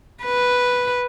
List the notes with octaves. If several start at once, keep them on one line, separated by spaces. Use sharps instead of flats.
B4